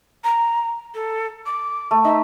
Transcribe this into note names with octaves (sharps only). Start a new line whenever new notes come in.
A#5
A4
D6
A3
D#4 E5